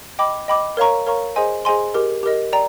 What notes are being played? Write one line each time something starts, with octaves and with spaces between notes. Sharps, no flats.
D#5 G5 B5 D6
D#5 G5 B5 D6
A#4 C#5 F5 A#5 C#6
A#4 C#5 F5 A#5 C#6
G#4 C5 D#5 G#5 C6
G#4 C5 D#5 G#5 C6
G4 A#4 D#5
G4 A#4 D#5
D5 G5 A#5